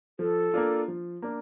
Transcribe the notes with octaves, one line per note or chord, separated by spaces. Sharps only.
F3 A4
A#3 D4 F4
F3
A#3 D4